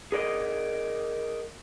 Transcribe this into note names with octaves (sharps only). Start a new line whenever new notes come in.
G#4 A#4 D5 D#5